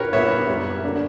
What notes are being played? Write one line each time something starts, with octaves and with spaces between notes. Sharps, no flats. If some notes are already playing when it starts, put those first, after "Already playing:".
Already playing: G4 A#4 B4 C#5
A#2 G3 B3 C#5 E5
F#2 C#3 G3
D3 A#3 D4